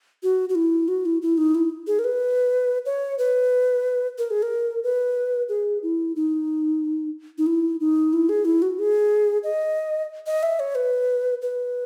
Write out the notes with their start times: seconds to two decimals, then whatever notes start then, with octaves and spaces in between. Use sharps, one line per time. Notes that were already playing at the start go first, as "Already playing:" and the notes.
0.23 F#4
0.49 F#4
0.55 E4
0.88 F#4
1.06 E4
1.22 E4
1.38 D#4
1.55 E4
1.87 G#4
1.99 A#4
2.04 B4
2.86 C#5
3.18 B4
4.18 A#4
4.31 G#4
4.43 A#4
4.84 B4
5.49 G#4
5.83 E4
6.16 D#4
7.38 D#4
7.46 E4
7.80 D#4
8.13 E4
8.29 G#4
8.45 E4
8.62 F#4
8.79 G#4
9.44 D#5
10.27 D#5
10.43 E5
10.60 C#5
10.75 B4
11.42 B4